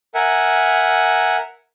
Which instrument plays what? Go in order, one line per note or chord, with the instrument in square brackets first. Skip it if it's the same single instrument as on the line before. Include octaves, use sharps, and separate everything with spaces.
[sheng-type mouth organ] A#4 E5 F#5 G#5